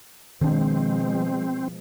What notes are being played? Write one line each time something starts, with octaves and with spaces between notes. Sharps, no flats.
B2 D#3 F3 G#3 C4 D4